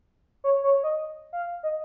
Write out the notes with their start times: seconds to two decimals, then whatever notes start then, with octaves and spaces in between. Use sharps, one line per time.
0.44 C#5
0.64 C#5
0.83 D#5
1.33 F5
1.63 D#5